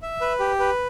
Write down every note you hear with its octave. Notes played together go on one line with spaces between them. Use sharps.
E5
B4
G4
B4